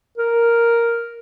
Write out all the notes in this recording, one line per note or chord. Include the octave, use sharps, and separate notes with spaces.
A#4